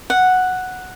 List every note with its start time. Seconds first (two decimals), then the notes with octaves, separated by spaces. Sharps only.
0.10 F#5